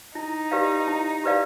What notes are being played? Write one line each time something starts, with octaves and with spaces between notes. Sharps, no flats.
D#4 E4
G4 B4 D5 F5
E4
G4 B4 D5 F5